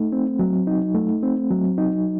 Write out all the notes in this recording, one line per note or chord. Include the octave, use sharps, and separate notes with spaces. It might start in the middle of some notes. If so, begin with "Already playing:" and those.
Already playing: A3 D#4
C4
F#3
D#4
A3
C4
F#3
D#4